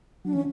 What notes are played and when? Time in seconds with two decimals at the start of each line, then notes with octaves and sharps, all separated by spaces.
0.25 F#3 D4
0.33 E3 C#4